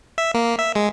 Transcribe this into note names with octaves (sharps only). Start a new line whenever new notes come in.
E5
A#3
E5
G#3